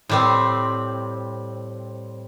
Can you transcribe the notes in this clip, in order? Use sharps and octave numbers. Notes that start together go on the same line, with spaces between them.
A2 G3 C4